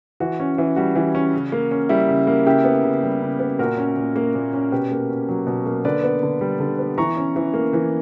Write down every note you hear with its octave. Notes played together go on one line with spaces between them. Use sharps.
E3 F#4
C#4
E3
G3 F#4
E3
C#4
C#3
A#3
C#4
G3 E4
C#3
A#3
C#3 E4 G4
B3
C#3
G3
C#3
B3
A#2 F#4 A#4
C#4
A#2
A#3
A#2
C#4
B2 G4 B4
A#3
C#4
F#3
B2
A#3
D3 B4 D5
B3
D3
G3
D3
B3
E3 A#5 C#6
C#4
E3
A#3
E3